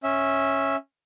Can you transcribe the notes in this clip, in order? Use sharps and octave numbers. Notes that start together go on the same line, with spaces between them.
C#4 E5